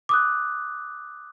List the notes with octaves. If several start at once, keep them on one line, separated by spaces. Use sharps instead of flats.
D6 D#6 F#6